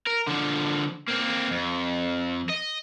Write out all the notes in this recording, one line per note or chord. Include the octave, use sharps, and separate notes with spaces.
A#4
D3 F3
A#3 C4
F2
D#5